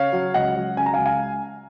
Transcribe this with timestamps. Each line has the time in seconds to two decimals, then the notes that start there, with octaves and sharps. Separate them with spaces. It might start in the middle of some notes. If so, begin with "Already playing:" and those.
Already playing: C#3 C#5 F5
0.13 F#3
0.34 C#2 D#5 F#5
0.56 F#3
0.77 C#3 G#5
0.86 A#5
0.94 F5 G#5
0.98 C#2
1.06 F5 G#5